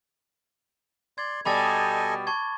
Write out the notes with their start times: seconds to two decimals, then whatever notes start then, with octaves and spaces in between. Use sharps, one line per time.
1.18 D5 C6 G#6
1.45 B2 G3 A4 D#5 G#5 B5 D6 A6
2.27 A5 C#6 G#6